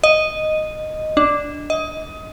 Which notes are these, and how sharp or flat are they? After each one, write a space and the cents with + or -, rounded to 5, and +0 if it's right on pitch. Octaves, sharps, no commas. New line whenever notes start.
D#5 -5
D4 +0
D#5 +20